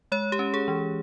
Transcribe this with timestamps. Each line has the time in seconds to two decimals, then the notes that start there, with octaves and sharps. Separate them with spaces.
0.12 G#3 C#5
0.32 G4
0.39 C#4
0.54 G#4
0.68 E3